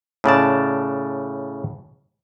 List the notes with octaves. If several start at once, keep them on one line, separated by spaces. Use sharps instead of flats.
A2 C#3 D5 A5